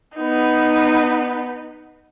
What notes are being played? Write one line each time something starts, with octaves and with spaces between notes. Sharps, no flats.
B3 D#4